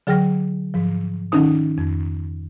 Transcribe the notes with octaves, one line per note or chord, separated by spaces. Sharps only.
D3 F#3 G#4 G5 F6 A#6
G#2 F3
D#3 C#4 D#4 D#6
F2